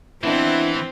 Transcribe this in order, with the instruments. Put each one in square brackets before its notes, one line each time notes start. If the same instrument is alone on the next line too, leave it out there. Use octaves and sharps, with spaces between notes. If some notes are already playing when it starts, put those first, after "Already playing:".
[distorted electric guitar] E3 [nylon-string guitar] B3 D4 D#5 [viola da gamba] C4 [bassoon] E4